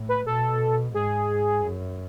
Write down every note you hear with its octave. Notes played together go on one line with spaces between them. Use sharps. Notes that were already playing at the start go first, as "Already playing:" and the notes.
Already playing: A2
B4
B2 A4
G#2 G#4
F#2